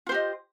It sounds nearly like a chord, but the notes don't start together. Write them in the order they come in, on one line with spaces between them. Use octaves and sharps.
F4 C5 G4 D#5